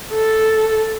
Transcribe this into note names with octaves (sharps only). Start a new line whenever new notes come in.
A4